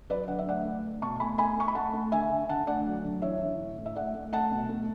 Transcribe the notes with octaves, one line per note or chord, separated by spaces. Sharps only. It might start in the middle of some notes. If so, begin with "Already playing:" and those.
F#3 B4 D5
D3 F#5
E5
A3 D5 F#5
A3
A3
B2 A5 C#6
A3 G#5 B5
A3 G#5 B5
A3 C#6
B5
A3 F#5 A5
A3
D3 E5 G#5
D3
D3 F#5 A5
A3 D5 F#5
F#3
D3
E3 C#5 E5
E3
A2
A2
E5
A3 D5 F#5
A3
A3 F#5 A5
B2
A3